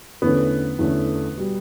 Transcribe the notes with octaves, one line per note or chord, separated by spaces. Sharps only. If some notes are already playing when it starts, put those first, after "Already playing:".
E2 D3 A3 B3 C#4
E2 D3 A3 C#4
B2 G3